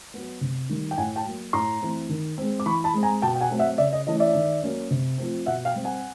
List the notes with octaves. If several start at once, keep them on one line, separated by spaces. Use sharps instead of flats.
F#3 B3
C3
D#3 G3
G5
A2 F#5 G#5
G5 A5
F#3 A#3
A2 A#5 C6
E3 A3 C4
D#3
G#3 C4
D6
E3 B5 C#6
A5 B5
G#3 C4
G#5 A#5
B2 G5 A5
G5
F#5 G#5
F#3 A3 C4
E5 F#5
C#3 D5 E5
D#5
E3 A3 C#4 D#5
D5 E5
D#3
F#3 A#3 C#4
C3
F3 A3 C4
B2 E5 F#5
F5 G5
G3 C4
F#5 G#5